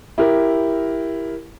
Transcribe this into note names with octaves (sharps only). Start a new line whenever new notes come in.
E4 G4 A#4